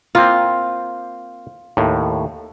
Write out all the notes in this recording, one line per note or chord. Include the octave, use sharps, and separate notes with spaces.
A#3 C4 F4
D#2 A2